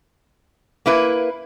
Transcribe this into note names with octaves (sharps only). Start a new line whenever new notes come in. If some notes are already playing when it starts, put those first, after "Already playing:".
A#3 E4 B4